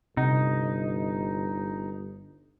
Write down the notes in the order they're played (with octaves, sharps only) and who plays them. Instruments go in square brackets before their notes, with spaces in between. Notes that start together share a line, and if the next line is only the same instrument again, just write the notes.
[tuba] G1 [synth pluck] C3 [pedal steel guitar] D#4